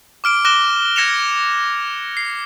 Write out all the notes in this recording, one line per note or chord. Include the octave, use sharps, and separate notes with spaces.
D6 F6 D7 G7
D6 F#6 A#6 D7 E7 G7
F6 G#6 A#6 C#7 E7 F7
C7